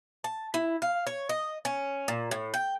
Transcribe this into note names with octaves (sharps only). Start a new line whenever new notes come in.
A5
E4
F5
C#5
D#5
C#4
A#2
A2
G5